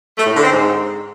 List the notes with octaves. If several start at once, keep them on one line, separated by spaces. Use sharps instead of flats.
A3
A2
D3
C4
G#2